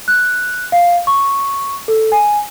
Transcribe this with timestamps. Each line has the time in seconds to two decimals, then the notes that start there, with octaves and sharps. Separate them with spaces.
0.08 F#6
0.72 F5
1.07 C#6
1.88 A4
2.12 G#5